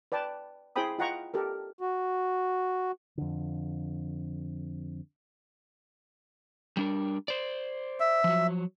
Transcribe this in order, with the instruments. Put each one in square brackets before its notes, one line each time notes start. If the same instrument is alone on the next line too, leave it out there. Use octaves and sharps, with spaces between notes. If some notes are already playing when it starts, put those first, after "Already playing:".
[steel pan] B4 D5 G5 A5
E4 G#4 C5 G5 B5 D#6
F4 D#5 F#5 G5 A#5 C#6
G4 A4 A#4
[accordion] F#4
[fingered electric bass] F2 D3
[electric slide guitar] G3 D4 A#4
C5 D5
[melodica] E5
[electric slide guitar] F3 F#3